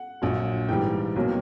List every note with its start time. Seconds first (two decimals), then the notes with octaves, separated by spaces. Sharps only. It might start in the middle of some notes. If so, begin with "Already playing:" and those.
Already playing: F#5
0.22 A#1 A#2 F#3
0.69 G#2 E3 G3 G5
1.16 B1 B2 F#3 A#3 C#4